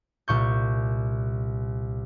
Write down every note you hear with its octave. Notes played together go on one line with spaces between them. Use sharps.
C2 A#2 C#6 G6